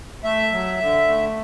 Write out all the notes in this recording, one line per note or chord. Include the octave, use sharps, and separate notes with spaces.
A3 E5
F#3
D3
A3